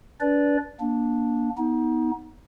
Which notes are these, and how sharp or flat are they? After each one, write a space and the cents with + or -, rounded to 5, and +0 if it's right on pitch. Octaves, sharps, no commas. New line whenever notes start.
D4 -35 B4 -10 D5 -10
A#3 +30 D4 +0
B3 +0 D#4 +30